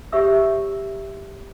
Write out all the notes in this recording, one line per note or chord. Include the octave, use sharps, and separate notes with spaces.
G4 C#5 E5 E6